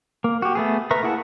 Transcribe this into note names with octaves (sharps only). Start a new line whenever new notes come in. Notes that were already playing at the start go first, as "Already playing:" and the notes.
A#3
F#4 G4
A3 B3 G#4
A#4 B4 E5 A#5 C#6
A#3 E4 G#4 F#5 A5